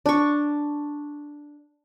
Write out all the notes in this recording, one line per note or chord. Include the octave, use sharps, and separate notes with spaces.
D4 C#6